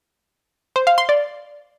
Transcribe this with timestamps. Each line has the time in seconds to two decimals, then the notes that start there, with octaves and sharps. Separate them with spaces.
0.76 C5
0.87 F5
0.98 C6
1.09 D5